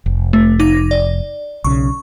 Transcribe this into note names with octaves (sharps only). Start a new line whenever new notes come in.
F1
A3
D#4 D6 A#6
D5
B1 C#3 C#6